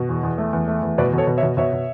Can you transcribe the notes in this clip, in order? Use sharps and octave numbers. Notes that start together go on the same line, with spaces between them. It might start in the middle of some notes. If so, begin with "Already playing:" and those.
Already playing: B2
E2
E2
A3
E2
A3
E2
B2 B4 D5
B2 A4 C#5
B2
C#5 E5
B2
B2 C#5 E5
B2